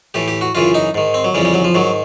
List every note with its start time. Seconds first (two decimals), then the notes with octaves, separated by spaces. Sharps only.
0.14 A2 E3 G4
0.28 G4
0.41 F#4
0.55 F#2 C#3 E3 F4
0.74 D#4
0.94 G#2 D#3
1.14 C4
1.24 F#3
1.34 F2 C#3 E3 G3
1.45 G3
1.54 F#3
1.64 F3
1.74 G#2 D#3 F#3